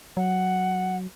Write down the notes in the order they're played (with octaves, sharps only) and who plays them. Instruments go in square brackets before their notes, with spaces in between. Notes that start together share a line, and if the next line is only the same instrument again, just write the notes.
[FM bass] F#3 [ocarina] F#5